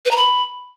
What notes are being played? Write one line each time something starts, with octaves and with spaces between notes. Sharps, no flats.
B4
A#5
B5